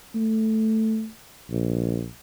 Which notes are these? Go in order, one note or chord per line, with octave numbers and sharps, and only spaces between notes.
A3
A#1